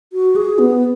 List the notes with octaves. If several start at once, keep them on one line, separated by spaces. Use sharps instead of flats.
F#4
G#4
B3